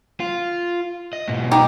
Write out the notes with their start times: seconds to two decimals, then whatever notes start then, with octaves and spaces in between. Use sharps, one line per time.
0.20 F4
1.13 D#5
1.28 G#2 B2
1.51 D#4 G4